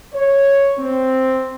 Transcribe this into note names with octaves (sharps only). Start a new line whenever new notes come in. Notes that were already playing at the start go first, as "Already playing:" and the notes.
C#5
C4